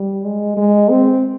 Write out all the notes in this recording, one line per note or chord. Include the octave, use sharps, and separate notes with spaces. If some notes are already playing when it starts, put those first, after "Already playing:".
Already playing: G3
G#3
G#3
C4